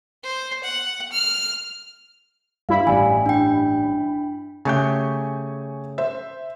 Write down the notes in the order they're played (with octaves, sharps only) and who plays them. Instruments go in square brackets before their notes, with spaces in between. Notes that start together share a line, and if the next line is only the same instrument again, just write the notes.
[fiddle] C5
F#5
F6
[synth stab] G2 E4 B5 [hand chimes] F5
[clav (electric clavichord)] A1 G3 [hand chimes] G#5
[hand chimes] D4 G5
[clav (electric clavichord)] C#3 A3 G4 [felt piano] G#5 C#6 G6
[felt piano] C5 E5